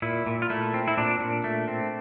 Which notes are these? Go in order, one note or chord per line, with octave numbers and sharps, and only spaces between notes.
A#2 E4
A#2
F4
A3 E4
C4
E4
A#2 D4
A#2
A3
C4